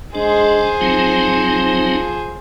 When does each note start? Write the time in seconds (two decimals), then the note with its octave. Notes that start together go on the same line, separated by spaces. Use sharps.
0.15 G#3 D4 G#4 C5
0.81 F3 F#3 C4 D#4